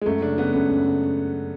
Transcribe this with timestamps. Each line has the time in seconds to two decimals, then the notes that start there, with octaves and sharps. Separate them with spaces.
0.01 G#3
0.06 F#2 A3
0.22 C#3 D4
0.38 C#3 B3
0.54 F#2 A3
0.70 F#2
0.86 C#3